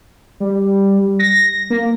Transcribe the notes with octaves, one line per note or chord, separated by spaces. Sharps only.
G3
A#6
A#3